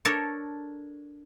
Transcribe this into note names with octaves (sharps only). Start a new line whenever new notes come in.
D4 A4 A#4 C#5